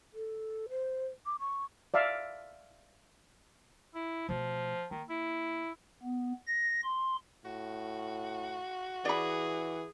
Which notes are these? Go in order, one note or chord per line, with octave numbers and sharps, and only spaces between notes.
A4
C5
D6
C#6
D5 E5 F5
E4
B2 F3 A3
D#3 A#3
E4
B3
A#6
C6
A2 F#4
E3 G#4 D5 B5